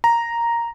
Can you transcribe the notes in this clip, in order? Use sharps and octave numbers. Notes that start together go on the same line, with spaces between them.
A#5